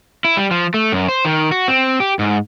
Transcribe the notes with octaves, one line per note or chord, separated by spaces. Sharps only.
E4
G3
F3
A3
F#2
C5
D#3
F#4
C4
G4
G#2